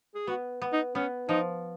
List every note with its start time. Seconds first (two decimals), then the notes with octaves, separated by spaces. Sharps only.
0.15 G#4
0.27 B3 F#4
0.62 B3
0.73 D#4
0.95 B3 C#4
1.29 F3 D#4